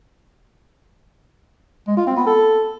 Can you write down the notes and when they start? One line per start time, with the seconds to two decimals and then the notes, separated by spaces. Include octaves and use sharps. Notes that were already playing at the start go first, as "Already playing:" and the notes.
1.87 G#3
1.97 F4
2.07 C4
2.17 B3
2.27 A4